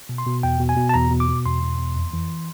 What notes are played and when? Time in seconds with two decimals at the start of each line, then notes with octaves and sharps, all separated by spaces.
0.09 B2
0.18 C6
0.27 B2
0.43 E2 G5
0.60 B2
0.69 G#5
0.77 B2
0.89 A5
0.94 E2 A#5
1.11 B2
1.20 D6
1.29 B2
1.46 E2 C6
1.63 B2
1.79 E2
1.96 F2
2.13 E3